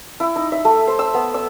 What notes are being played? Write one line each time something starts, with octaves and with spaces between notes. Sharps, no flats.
E4
D#4
E5
A3
C5
E6
B3
E6